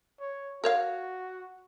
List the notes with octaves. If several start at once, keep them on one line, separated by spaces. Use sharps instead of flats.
C#5
F#4 A#4 C#5 F5